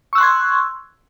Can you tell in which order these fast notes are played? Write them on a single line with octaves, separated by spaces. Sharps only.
C#6 E6 F#6 C6 G#6